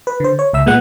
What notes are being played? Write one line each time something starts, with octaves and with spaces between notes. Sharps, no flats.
B4
D3 C5
C#5
C#2 E5 E6
A#2 G#3 B3 F#5